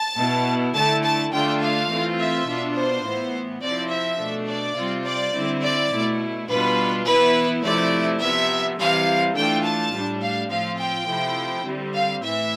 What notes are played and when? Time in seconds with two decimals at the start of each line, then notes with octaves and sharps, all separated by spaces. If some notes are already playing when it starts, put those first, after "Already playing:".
Already playing: A5
0.17 B2 B3 E4
0.75 D3 A3 E4 A5
1.04 A5
1.33 D3 A3 D4 F4 G5
1.61 F5
1.90 E3 A3 C4 F4
2.19 E5
2.47 B2 B3 D4 F4
2.76 C5
3.05 A2 E3 B3
3.62 C3 F3 C4 E4 D5
3.91 E5
4.19 B2 A3 D4
4.49 D5
4.77 C3 G3 C4 F4
5.06 D5
5.34 D3 G3 C4 E4
5.63 D5
5.92 B2 A3 E4
6.49 B2 G3 D4 F4 B4
7.06 E3 B3 E4 B4
7.64 C3 F3 A3 E4 D5
8.21 C3 F3 B3 E5
8.79 C3 E3 G3 F5
9.36 E3 A3 D4 F4 G5
9.65 A5
9.94 A2 G3 D4
10.22 F5
10.51 A2 F3 C4 F4 F5
10.80 G5
11.08 C3 F3 A3 E4
11.66 D3 G3 C4
11.94 F5
12.23 A2 E3 E5